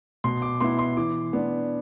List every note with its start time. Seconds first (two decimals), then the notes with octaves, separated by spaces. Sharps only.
0.24 B2 C6
0.42 D6
0.61 B3 E4 C6
0.79 C6
0.97 E3 D6
1.33 B3 D4